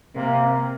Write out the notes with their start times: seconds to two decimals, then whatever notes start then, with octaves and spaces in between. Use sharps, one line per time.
0.15 C3 A#3